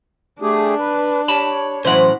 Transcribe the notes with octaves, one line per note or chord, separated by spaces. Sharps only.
A3 D4 G4 G#4
B4
G4 C#5 A5 B5
F#2 A2 E3 E4 C5 F#5